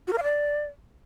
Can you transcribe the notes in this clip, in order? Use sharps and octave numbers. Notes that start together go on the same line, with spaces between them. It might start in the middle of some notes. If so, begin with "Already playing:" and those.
F#4
A#4
F5
D5